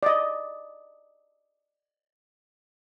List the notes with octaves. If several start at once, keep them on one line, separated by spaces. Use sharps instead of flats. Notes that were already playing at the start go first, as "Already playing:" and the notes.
D5 D#5